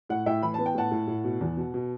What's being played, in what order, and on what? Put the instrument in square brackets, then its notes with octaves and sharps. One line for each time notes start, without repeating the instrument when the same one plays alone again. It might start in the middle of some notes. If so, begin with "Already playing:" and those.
[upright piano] A2 F#5
A2 E5 G5
E3 B5
B3 A5
G5
A2 F#5 A5
A2
A2
B2
E2
B2
B2